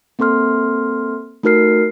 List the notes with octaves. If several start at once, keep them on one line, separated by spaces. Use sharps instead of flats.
A#3 C4 A4 C6 F6
A3 D#4 F#4 A#4 F6 C7